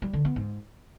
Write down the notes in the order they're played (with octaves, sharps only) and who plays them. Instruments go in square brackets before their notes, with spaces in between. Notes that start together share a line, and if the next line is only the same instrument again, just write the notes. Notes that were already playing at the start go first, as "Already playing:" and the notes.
[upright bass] G3
D3
B3
G#2